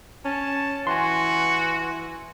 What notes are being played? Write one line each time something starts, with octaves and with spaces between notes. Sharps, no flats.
C#4 A5
E3 F#4 G#5 C6